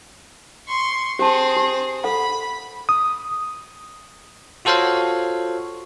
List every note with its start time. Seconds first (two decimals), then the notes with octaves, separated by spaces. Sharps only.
0.68 C6 C#6
1.19 C4 G4 G#4 A5
1.57 G4
2.04 A4 F#5 B5
2.89 D#6
4.65 F4 F#4 A4 C5 C#5 F5